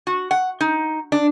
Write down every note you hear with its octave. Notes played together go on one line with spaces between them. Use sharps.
F#4
F#5
D#4
D4